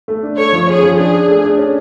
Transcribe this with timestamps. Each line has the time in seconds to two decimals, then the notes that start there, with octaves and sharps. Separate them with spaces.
0.08 A3
0.23 D4
0.37 A3 C#5
0.53 F3
0.68 C#4 G#4
0.83 F3
0.98 D4 G#4
1.14 D4
1.28 A3
1.44 D4
1.58 C#4